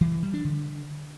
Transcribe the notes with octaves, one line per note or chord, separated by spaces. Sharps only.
E3
E3
G3
D4
D3